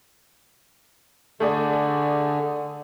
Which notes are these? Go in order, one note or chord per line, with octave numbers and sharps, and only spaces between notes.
D3 A3 G#4 D5